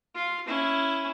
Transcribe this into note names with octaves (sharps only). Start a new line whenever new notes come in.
F4
C#4 E4